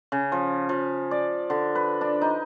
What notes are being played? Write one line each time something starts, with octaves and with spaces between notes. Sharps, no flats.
C#3
F3
F3
D5
D3
B4
D4
D#4